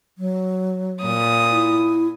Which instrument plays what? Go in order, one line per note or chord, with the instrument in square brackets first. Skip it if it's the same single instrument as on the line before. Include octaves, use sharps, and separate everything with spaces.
[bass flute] F#3
[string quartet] A#2 D#6
[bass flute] E4